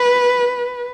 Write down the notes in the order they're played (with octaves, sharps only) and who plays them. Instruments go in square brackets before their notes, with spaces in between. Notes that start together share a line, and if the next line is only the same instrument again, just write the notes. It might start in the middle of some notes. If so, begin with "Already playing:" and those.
Already playing: [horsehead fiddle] B4